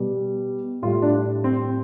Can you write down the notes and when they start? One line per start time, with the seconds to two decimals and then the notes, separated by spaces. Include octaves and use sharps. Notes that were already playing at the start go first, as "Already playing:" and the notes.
Already playing: B2 G3
0.82 A2 G3 F4
1.02 D4
1.44 C4